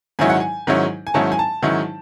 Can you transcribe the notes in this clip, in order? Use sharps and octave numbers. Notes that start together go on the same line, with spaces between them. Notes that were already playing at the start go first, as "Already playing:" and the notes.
G#2 D#3 F#3 C#4 E4 G#5
F#5
G#5
G#2 D#3 F#3 C#4 E4
G#5
G#2 D#3 F#3 C#4 E4 A5
G#5
A5
G#2 D#3 F#3 C#4 E4